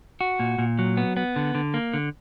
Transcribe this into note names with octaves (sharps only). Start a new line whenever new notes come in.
F#4
A#2
A#2
F#3
B3
B3
D3
D3
A#3
D3